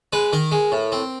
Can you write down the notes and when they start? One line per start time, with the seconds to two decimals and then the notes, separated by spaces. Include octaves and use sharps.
0.13 G#3 B4
0.33 D#3 A#4
0.52 G#3
0.72 A2
0.92 C4